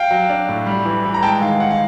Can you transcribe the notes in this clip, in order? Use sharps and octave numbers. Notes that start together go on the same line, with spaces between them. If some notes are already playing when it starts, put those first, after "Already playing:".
Already playing: F5 G5
F#3
D4
A2
G3
E3
E3
A#5
G#3 G5 A5
D#3 F5
D#3 F#5
F5